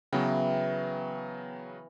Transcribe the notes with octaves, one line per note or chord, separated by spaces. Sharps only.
C#3 E3 F#3 B3 G5